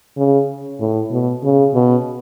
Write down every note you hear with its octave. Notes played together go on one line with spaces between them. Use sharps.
C#3
A2
B2
C#3
B2